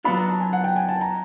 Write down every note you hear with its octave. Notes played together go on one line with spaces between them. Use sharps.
F#3 B3 D4 F4 B5
A#5
A5
G#5
F#5
G5
G#5
A5
A#5